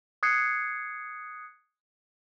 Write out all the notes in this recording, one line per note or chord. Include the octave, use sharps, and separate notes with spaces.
D#6 F#6 G#6 C7 C#7